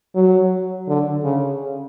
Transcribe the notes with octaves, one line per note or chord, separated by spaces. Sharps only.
F#3
D3
C#3